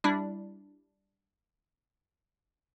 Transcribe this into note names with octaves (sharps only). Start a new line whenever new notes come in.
G3 D4 E4